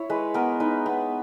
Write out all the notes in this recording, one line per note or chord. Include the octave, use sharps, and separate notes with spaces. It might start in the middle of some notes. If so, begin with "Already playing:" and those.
Already playing: E4 C#5
G#3 B4
B3 A#4
D#4 B4
B3